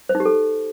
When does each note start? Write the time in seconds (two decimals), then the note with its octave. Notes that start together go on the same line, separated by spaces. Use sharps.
0.09 C5
0.15 D#4
0.20 G4
0.25 A4